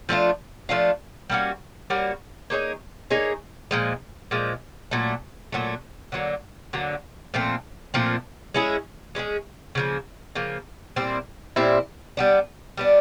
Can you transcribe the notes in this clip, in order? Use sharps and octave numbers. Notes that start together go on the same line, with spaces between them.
F3 A3 D4 F4
F3 A3 D4 F4
G3 A#3 C#4 F#4
G3 A#3 C#4 F#4
A#3 D#4 G#4 C#5
A#3 D#4 G#4 C#5
A#2 F3 G#3
A#2 F3 G#3
A#2 F#3 A3
A#2 F#3 A3
D3 F#3 A#3
D3 F#3 A#3
A#2 F3 A3 C4
A#2 F3 A3 C4
G#3 C#4 E4 G#4
G#3 C#4 E4 G#4
C#3 F3 A#3
C#3 F3 A#3
A#2 G3 C4 E4
A#2 G3 C4 E4
G3 B3 D4
G3 B3 D4